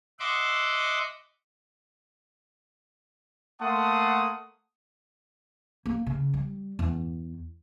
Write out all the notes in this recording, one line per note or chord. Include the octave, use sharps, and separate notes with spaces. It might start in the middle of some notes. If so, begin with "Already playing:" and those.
D#5 E5 F#5 C6 D6
A3 A#3 F#5 A5 C6 D#6
A#3
C#3
G3
E2